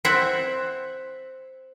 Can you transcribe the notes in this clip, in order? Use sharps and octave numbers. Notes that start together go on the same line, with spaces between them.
C4 E4 E5 F#5